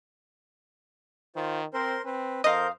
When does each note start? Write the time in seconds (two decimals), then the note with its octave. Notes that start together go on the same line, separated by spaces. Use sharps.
1.36 D#3 F4 C5
1.74 C4 A#4 C5 C6
2.05 C4 B4
2.44 F2 A#4 C5 D#5 F5 D#6 G6